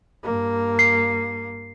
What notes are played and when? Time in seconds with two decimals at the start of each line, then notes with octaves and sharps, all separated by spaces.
0.23 G2 A#3
0.79 C7